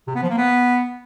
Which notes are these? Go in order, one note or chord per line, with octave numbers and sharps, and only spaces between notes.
C3
B3
F3
A#3
B3